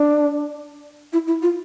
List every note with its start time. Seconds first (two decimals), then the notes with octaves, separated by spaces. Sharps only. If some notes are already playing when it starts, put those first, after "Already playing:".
Already playing: D4
1.13 E4
1.27 E4
1.42 F4